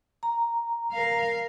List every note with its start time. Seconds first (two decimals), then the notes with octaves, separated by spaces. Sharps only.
0.23 A#5
0.92 A#4 F5